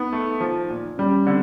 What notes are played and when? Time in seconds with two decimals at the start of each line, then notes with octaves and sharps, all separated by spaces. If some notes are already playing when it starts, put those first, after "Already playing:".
Already playing: B3 D#4
0.13 A3
0.40 F3
0.70 A#2
0.98 G3 C#4
1.27 D3 C4